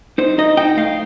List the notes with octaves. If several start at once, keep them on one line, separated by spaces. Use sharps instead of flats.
D#4 C5
D#4 D#5
D#4 G5
A3 F5